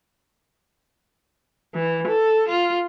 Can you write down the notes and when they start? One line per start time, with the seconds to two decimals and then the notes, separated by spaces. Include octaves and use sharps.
1.74 E3
2.08 A4
2.49 F4